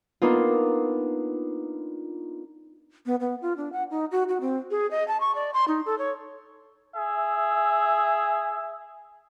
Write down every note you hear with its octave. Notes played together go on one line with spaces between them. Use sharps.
A#3 B3 D4 D#4 F4
B3
B3
F4
D4
F#5
D#4
F#4
F#4
C4
G#4
D#5
A5
C#6
D5
C6
D#4
A4
C#5
G#4 E5